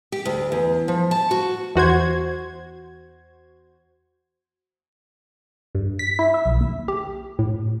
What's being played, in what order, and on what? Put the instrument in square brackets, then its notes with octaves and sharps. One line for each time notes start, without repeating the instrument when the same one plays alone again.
[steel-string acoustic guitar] G4
D2
E2
F3
A5
F#4
[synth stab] E2 F#4 C5 G#6
G2
B6
E4
E5
B1
D#2
[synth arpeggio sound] G4
A2